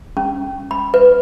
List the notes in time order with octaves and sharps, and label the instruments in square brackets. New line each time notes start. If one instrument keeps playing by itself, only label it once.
[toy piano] C#4
B5
B4